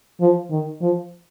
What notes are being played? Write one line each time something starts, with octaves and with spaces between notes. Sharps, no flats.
F3
D#3
F3